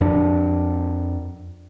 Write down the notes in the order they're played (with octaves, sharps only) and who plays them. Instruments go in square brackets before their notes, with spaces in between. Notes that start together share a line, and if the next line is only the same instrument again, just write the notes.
[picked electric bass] F2 D4